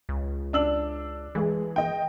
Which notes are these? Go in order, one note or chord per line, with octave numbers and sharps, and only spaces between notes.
C#2
D4 E6 F#7
E3 G#3 G#4
D#5 G5